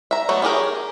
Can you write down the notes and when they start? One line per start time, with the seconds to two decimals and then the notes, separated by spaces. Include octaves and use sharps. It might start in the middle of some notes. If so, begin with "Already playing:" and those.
0.11 E5 A#5
0.29 F#3 A3 B3
0.42 C#4 G4 G#4 A#4